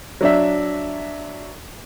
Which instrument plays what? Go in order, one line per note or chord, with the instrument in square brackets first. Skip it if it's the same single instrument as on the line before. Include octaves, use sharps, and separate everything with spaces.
[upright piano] F#3 D4 E5